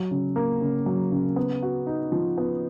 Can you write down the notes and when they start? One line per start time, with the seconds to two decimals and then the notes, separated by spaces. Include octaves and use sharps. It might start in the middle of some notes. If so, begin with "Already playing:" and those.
Already playing: F#3
0.11 C#3
0.36 A#3
0.61 C#3
0.86 F#3
1.12 C#3
1.36 B3
1.63 F#4
1.87 D#4
2.12 F3
2.38 B3